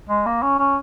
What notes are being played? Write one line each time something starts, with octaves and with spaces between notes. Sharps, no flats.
G#3
A#3
C#4
C#4